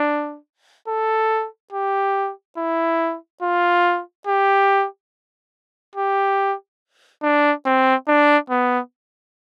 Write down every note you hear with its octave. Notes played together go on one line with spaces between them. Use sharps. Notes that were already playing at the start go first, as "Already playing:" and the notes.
Already playing: D4
A4
G4
E4
F4
G4
G4
D4
C4
D4
B3